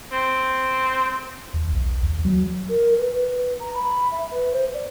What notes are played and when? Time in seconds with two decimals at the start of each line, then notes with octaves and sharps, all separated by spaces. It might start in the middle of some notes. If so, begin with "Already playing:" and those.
0.12 C4
1.54 D#2
1.73 B1
2.03 D#2
2.25 F#3
2.69 A#4
2.97 B4
3.12 B4
3.60 A#5
3.74 B5
4.11 E5
4.31 B4
4.53 C5
4.74 D5